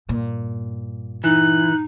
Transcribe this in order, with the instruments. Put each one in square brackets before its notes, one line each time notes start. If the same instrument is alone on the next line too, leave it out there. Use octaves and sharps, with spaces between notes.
[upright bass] G2 A#2
[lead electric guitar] E3 [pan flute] D#4 [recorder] F#6